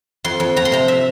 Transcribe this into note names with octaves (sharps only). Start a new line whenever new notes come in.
F2 C6
F2
F2 A#5
C6
C3 A#5
E5